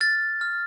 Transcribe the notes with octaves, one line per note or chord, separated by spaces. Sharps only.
F6 A6
F6